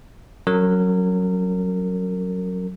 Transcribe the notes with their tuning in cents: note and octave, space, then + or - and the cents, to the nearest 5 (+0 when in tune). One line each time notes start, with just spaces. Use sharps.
F#3 +0 C#4 -5 A#4 -30